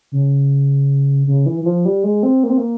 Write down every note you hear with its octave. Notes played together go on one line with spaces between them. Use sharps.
C#3
C#3
E3
E3
F3
G3
G#3
C4
A#3
C4
A#3